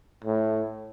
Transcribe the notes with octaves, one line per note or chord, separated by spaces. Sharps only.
A2